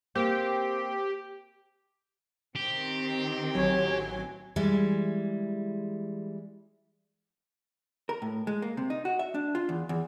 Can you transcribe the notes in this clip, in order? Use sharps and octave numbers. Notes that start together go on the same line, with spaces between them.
A#3 C4 G4
D#3 C4 G4
A1 F#3 C#5 G#5
E3 G3 G#3
A#4
A2
G#3
A#3
C3
D#4
F#4
E5
D4
F4
E2
E2